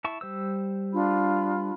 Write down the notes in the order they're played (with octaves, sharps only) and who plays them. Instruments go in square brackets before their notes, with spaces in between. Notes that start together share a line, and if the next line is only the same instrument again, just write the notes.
[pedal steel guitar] E4 A5 C#6
G3 C5 E6
[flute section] D4 F4 B5